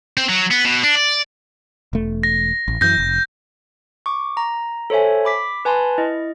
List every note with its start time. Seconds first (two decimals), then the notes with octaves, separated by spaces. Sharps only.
0.17 C4
0.29 F#3
0.51 B3
0.65 B2
0.83 D4
0.96 D5
1.93 E1 A3
2.23 A#6
2.68 A1
2.81 F#2 E3 G6 A#6
2.98 F1
4.06 C#6 D6
4.37 A#5
4.90 A4 C5 C#5 E5 G#5
5.25 B5 D6 B6
5.65 B4 G#5 A5 B5 C6
5.98 E4 D#5